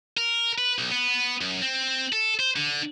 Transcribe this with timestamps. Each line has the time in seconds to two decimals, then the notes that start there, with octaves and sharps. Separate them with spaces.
0.17 A#4
0.58 B4
0.78 B1
0.92 B3
1.41 F#2
1.62 C4
2.13 A4
2.39 C5
2.56 D3